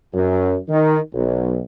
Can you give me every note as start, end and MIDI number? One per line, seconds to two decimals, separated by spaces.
0.14 0.57 42
0.69 0.97 51
1.14 1.60 35